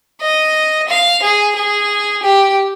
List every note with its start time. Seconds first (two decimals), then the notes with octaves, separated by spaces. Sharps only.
0.21 D#5
0.88 F5
1.22 G#4
1.55 G#4
2.22 G4